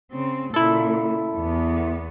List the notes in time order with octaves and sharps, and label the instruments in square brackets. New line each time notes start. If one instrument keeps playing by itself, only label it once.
[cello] C#3 C4
[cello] A#2 C#3 [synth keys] E4 A4
[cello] E2 B3